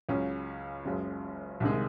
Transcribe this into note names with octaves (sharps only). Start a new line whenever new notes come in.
C#2 C#3 F#3 C#4
F#1 F#2 C#3 G#3 C#4
C2 C3 D#3 G#3